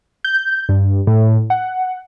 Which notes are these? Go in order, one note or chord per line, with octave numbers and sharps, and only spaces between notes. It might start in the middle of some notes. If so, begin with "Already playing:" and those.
G6
G2
A2
F#5